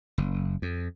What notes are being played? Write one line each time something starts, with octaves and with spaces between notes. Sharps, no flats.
F#1
F2